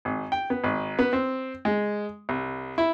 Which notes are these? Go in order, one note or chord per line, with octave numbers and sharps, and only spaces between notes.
G#1
G5
B3
G#1
B3
C4
G#3
C2
E4